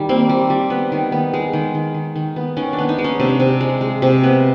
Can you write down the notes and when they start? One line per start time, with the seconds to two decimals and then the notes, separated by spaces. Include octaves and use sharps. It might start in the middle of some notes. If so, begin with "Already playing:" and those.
Already playing: D#3 G3
0.09 A#3 C4
0.29 G3
0.50 G3
0.70 B3
0.92 D#3
1.12 B3
1.34 G#3
1.53 D#3
1.75 D#3
1.94 D#3
2.16 D#3
2.36 B3
2.57 D#3 C#4
2.73 D4
2.79 B3
2.89 D#4
2.98 G#3
3.04 C#4
3.20 C3 D4
3.40 C3
3.61 G#3
3.81 G#3
4.02 C3
4.23 B3